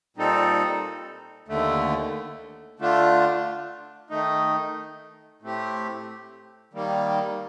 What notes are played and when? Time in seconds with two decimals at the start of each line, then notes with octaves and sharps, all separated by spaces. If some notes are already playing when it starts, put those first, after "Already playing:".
0.17 A#2 G3 C4 D#4 A4
1.48 D#2 D3 A3
2.79 D3 A3 D4 F4
4.10 D#3 A3 D#4
5.42 A2 A3 C4 G4
6.73 D#3 G3 A#3